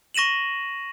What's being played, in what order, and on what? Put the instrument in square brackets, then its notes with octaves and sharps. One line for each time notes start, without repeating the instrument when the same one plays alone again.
[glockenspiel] C#6 A#6 D#7 E7 F#7